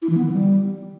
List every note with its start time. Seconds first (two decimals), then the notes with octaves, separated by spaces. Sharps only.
0.02 E4
0.10 E3
0.17 B3
0.25 D#3
0.33 G3